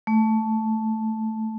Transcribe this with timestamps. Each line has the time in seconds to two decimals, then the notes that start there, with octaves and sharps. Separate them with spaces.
0.07 A3